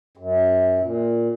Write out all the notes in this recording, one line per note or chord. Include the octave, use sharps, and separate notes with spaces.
F#2
A#2